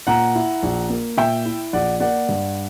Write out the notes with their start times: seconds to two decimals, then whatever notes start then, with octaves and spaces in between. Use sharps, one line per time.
0.07 A#2 F#5 A#5
0.35 E4
0.63 A#1
0.90 A#3
1.17 A#2 E5 G5
1.45 E4
1.73 A#1 D5 F#5
2.00 A#3 D5 F#5
2.29 G2